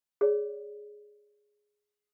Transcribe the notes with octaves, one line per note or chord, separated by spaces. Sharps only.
G#4 C#5 D5